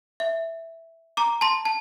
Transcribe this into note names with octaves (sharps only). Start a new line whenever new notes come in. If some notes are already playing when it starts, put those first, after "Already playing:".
E5
A#5 D6
A5 C6
A5